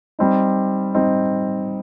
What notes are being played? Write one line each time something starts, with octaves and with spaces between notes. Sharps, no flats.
G3 C4 D#4
G3 C4 D#4